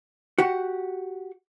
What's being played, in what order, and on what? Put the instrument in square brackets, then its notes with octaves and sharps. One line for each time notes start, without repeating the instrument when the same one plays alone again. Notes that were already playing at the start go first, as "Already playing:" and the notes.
[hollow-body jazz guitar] F#4 G4 F#5